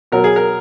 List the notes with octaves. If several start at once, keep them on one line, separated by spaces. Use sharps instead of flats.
B2 F#3 A#4
G#4
A#4